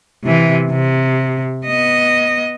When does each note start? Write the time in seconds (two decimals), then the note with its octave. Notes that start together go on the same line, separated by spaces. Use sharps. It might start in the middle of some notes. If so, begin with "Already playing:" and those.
0.24 C3 E3
0.71 C3
1.66 B3 D#5